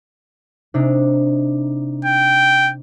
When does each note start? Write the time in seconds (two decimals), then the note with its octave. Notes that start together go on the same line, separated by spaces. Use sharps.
0.74 C3 D4 D#4
2.05 G5